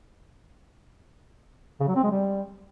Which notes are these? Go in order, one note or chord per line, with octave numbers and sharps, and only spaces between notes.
C#3
F#3
C4
G#3
G3